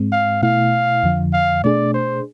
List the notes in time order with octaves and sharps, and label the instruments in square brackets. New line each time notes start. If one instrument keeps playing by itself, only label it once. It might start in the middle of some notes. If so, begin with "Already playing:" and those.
Already playing: [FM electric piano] G#2 G#3 C4
[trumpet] F5
[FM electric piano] B2 A3 E4 [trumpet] F5
[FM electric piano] F2 D3 F3
[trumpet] F5
[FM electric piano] B2 A3 D4 G#4 [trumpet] D5
[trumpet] C5